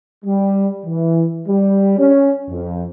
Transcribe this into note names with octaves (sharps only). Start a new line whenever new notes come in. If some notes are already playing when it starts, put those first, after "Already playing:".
G3
E3
G3
C#4
F2